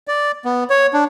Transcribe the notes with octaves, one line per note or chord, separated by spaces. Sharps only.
D5
B3
C#5
D4